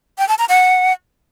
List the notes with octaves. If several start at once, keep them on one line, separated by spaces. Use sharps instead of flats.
G5
A5
A#5
F#5